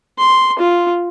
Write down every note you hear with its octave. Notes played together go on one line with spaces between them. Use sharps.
C6
F4